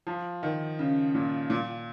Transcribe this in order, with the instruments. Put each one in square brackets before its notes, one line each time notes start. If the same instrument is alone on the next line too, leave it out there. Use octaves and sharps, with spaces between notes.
[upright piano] F3
D#3
C#3
A#2
A#2